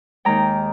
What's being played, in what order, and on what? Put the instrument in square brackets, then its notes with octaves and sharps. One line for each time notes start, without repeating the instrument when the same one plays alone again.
[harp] D#2 D#3 G#3 G5 A#5